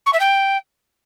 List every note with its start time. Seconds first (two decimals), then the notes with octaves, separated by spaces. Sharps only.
0.06 C#6
0.13 E5
0.20 G5